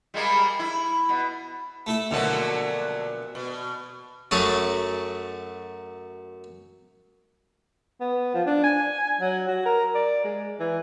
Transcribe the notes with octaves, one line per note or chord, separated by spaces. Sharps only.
G3 G#3 A#3
E4
B2
A3 E4
A#1 B2 D3 F#3 A3
B2
F#2 F#3 A3 G#4 A5
B3
F3
D4
G#5
F#3
F#4
A#4
D5
G#3
E3